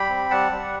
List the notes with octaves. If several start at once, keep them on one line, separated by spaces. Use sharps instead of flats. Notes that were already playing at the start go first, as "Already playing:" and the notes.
Already playing: G3 G5 B5
C4
G3 F#5 A5
G3